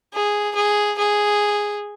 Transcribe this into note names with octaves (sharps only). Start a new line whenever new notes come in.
G#4
G#4
G#4